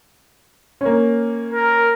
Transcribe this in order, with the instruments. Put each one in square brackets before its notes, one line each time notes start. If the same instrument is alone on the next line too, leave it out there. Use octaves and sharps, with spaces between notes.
[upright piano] A#3 C#4
[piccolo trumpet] A#4